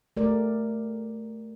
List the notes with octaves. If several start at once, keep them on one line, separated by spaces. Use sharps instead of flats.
A3 G4 A#4 D5